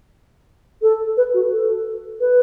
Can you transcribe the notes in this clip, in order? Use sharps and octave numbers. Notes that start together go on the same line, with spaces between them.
A4
B4
F#4
A4
B4